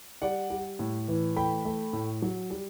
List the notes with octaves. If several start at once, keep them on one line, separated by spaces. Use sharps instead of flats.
G3 D5 F#5
G3
A2
E3
A3 G5 B5
A3
A2
F#3
G3